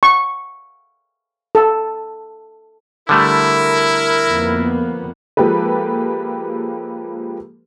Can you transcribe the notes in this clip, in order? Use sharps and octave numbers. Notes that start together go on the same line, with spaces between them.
C#6
A4
D3 G3 A3 E4 A#4
F2 A#3 B3
F3 G#3 A#3 G4 A4 B4